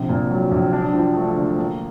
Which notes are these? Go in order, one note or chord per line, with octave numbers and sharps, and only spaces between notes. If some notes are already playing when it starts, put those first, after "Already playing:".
Already playing: A#1 C3
A#2
F#3
A#1
D4
F3
A3
D3
A#3